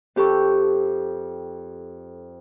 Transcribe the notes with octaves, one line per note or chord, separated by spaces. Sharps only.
F2 G4 A4 C#6